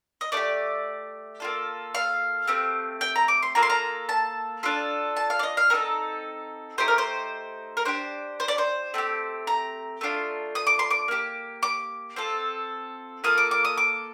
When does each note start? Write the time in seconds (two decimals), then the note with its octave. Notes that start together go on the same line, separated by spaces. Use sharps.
0.21 D#5
0.32 A3 D4 D5
0.37 G4
1.40 A#3 F4 A4
1.95 F5
2.48 A3 C4 G4
3.01 G5
3.16 A#5
3.28 D6
3.43 C6
3.55 A#3 F4 A4 A#5
3.63 C6
3.70 A#5
4.09 A5
4.63 D4 F4 A4
5.17 A5
5.30 F5
5.39 D5
5.43 D#5
5.57 F5
5.70 C4 D#4 A4 A#4
6.78 A3 D#4 G4 C5
6.88 A#4
6.98 C5
7.77 A#4
7.85 D4 G4 C5
8.40 C5
8.48 D5
8.58 C5
8.94 A3 C4 G4
9.47 A#5
10.01 A3 D4 F4
10.55 D#6
10.67 D6
10.79 C6
10.91 D6
11.08 A#3 D4 G4
11.63 D6
12.16 C4 F4 A4
13.24 A#3 F4 A4 D#6
13.38 D6
13.51 D6
13.65 D#6
13.77 D6